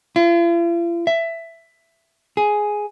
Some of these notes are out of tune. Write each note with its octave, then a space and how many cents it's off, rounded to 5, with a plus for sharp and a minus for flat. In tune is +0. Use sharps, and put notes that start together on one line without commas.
F4 -45
E5 +10
G#4 +5